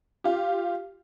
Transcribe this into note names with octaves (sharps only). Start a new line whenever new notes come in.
F4 G4